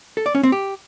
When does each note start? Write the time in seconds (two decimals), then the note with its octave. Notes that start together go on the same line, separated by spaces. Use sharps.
0.17 A4
0.26 D5
0.35 C#4
0.43 C4
0.52 G4